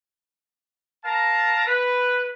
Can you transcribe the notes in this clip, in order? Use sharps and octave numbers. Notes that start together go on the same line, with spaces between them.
A#4 F5 A5 A#5
B4